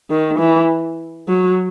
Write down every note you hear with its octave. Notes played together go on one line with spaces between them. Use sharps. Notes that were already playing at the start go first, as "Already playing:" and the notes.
D#3
E3
F#3